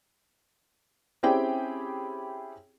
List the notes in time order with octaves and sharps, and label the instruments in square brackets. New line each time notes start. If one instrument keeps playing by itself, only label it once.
[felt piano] C4 C#4 E4 G4 G#4 G5